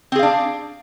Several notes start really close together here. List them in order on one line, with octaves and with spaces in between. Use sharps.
C4 G#4 F5 D4